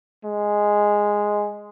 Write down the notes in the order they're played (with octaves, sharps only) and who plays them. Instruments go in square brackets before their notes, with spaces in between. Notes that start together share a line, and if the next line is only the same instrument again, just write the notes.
[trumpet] G#3